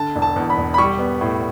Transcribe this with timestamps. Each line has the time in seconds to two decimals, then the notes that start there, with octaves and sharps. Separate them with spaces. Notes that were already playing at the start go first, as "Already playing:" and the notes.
Already playing: D3 A5
0.15 E1
0.22 A5
0.36 E2
0.50 B5
0.58 E1
0.74 B5
0.78 G3 C#6
0.99 B3
1.21 A2